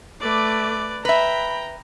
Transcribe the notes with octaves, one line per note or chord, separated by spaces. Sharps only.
A3 B4 D5 D6
B4 E5 G5 A#5 B5